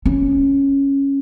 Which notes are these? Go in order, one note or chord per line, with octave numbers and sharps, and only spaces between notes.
C#4